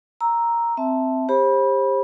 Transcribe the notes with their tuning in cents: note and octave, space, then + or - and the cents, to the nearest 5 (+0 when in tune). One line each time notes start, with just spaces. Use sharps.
A#5 +0 E6 +0
C4 -5 E5 +0 A5 +0
G4 +25 C5 +35 B5 -20